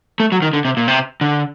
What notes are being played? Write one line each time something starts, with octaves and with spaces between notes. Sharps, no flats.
A3
F#3
D#3
D3
C3
A#2
C3
D3